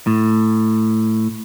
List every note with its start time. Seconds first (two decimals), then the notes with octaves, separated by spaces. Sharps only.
0.07 A2